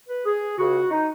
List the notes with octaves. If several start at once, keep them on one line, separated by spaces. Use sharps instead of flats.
B4
G#4
C#2 C#3 F#4
D#4